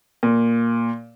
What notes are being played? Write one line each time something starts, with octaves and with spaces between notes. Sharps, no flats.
A#2